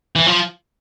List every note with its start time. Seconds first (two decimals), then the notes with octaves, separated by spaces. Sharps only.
0.16 E3
0.26 F3